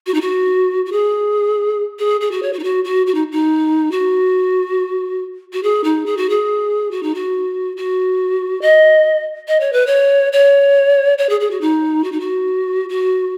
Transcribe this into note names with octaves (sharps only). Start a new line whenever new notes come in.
F#4
D#4
F#4
F#4
G#4
G#4
G#4
F#4
C#5
F#4
D#4
F#4
F#4
F#4
D#4
D#4
F#4
F#4
G#4
D#4
G#4
F#4
G#4
F#4
D#4
F#4
F#4
D#5
D#5
C#5
B4
C#5
C#5
C#5
G#4
G#4
F#4
D#4
F#4
D#4
F#4
F#4